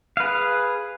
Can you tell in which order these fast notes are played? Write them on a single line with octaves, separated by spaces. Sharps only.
F5 B4 G#4